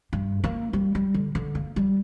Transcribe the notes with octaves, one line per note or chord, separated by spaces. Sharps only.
G2
A#3
G3
G3
D3
D3
A#3
G3